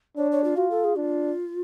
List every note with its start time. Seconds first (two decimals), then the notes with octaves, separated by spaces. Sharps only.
0.17 D4 C#5
0.31 C#5
0.44 F4
0.57 F4 F#4
0.70 A4
0.84 G#4
0.96 D4 F4